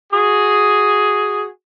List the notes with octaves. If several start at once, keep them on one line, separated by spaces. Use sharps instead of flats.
F#4 G#4